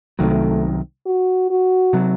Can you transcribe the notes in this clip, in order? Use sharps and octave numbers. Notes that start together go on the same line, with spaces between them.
C2 C3 D#3 F#3 A3
F#4
F#4
C3 F#3